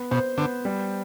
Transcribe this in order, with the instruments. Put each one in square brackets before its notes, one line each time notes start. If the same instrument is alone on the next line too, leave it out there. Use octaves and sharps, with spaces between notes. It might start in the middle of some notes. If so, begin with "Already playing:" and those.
Already playing: [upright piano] B3
[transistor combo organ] B2 [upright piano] C5
[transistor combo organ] D3 [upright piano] B3
[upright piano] G3